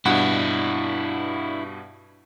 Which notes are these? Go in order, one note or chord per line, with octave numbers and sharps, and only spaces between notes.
G2 B2 D4 E4 F#5